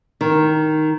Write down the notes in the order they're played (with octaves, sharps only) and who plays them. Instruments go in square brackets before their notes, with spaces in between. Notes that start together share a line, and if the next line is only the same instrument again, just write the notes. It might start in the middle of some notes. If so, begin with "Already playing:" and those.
[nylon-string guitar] D#3